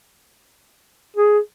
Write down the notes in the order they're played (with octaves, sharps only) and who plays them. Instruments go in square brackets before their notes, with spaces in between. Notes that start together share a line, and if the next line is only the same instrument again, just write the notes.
[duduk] G#4